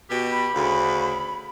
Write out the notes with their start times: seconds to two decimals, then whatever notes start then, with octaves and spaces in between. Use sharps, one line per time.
0.09 B2 G4
0.32 B5
0.54 D2 C#3